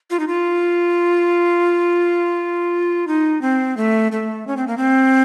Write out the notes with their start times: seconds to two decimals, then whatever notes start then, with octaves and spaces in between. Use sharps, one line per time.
0.10 F4
0.20 D#4
0.28 F4
3.07 D#4
3.42 C4
3.77 A3
4.12 A3
4.47 C#4
4.57 C4
4.67 A#3
4.78 C4